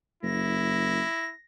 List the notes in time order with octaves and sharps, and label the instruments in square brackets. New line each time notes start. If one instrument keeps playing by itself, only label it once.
[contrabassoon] F#1 [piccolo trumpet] E4 [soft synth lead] A#6